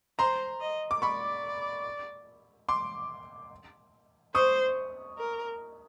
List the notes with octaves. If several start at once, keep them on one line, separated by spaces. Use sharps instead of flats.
C5 A#5 C6
D#5
D6
D5 B5 C#6
C6 D6
C5 C#6 D#6
A#4